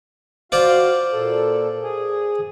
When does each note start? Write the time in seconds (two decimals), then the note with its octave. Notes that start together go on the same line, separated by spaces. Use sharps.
0.52 F4 F#4 C5 D5 F5
1.12 A#2 A4
1.82 G#4